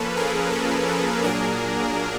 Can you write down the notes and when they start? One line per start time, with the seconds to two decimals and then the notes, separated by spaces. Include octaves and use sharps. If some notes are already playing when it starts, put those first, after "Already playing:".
Already playing: F3 A#3 C#4 A4 B4
0.17 G#4 A#4
0.53 A4
0.88 A4
1.23 A#2 F#3 A#3 D4 G#4 A#4